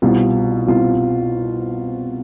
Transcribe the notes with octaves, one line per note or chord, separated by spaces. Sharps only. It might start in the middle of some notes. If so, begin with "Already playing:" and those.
C2 B2 G3 C4 F4
C2 B2 G3 C4 F4